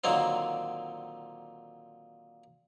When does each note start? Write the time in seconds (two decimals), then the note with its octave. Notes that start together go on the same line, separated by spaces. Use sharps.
0.04 A#2 D3 D#3 F#3 A#3 C4